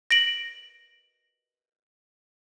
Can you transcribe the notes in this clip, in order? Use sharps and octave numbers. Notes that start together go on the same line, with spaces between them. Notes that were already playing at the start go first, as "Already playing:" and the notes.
A#6 D7 F#7